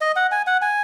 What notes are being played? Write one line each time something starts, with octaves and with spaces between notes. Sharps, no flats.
D#5
F#5
G#5
F#5
G#5